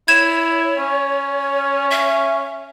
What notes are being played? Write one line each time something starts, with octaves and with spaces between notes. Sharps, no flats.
E4 C#5 G#6 E7
C#4
E5